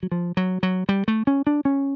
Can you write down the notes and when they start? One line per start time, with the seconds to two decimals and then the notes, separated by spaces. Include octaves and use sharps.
0.03 F#3
0.12 F3
0.37 F#3
0.63 F#3
0.89 G3
1.08 A3
1.27 C#4
1.47 D4
1.65 C#4